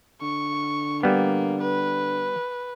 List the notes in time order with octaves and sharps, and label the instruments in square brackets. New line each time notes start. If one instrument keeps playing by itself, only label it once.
[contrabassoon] D3 [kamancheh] C#6
[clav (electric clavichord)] G3 B3 [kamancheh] A#3
[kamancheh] B4